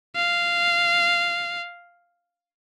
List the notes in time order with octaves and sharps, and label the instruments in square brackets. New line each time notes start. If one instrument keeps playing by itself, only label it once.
[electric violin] F5